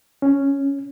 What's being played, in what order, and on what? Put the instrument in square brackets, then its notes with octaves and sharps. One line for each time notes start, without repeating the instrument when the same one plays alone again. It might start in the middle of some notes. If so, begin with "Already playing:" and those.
[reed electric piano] C#4